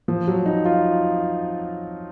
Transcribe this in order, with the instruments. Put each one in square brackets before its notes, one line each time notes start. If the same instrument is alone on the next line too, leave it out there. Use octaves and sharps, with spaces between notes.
[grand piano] F3
F#3
D#4
F4